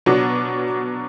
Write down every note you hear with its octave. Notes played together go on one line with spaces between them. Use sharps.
B2 F#3 B3 D4